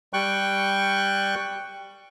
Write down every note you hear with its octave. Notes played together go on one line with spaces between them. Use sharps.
G3 G5 C#6 F#6